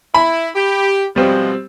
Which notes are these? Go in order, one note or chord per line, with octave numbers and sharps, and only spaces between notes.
E4 B5
G4
B2 F3 G3 G#3 C4